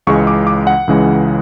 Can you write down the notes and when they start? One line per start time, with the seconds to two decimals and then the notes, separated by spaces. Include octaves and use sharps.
0.07 C#2 C#3 E3 G#3 C#6
0.27 D6
0.47 D6
0.67 F#5
0.88 C#2 C#3 E3 G#3